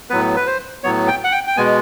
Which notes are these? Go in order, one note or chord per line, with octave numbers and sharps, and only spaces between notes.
A2 F#3 B3 B4
B4
C5
A2 F#3 B3 C#5
G5
F#5
G5
G5
B2 G#3 B3 G#5